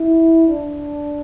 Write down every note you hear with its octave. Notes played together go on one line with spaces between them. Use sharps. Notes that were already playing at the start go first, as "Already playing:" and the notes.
Already playing: E4
D4